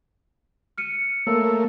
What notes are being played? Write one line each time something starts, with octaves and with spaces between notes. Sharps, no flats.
F6 C#7 D#7
A3 A#3 C#5 E6